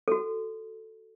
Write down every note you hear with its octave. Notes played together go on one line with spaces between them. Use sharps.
F#4 A4